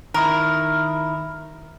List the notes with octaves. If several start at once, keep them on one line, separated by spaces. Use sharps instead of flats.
D#3 E4 A#4